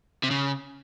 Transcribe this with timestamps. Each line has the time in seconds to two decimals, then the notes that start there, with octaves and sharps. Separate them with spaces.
0.23 C3
0.31 C#3